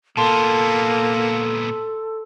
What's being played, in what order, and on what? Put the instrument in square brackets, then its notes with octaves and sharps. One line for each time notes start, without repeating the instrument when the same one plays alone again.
[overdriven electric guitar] A#2 B3 [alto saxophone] A#3 [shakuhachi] A4 [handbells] A5 C6